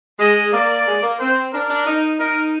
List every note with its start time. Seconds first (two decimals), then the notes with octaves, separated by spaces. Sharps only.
0.19 G#3 D#5
0.53 A#3 D5
0.87 G#3
1.03 A#3
1.19 C4 C5
1.54 D4 A#4
1.70 D4
1.87 D#4
2.20 D#4 A#4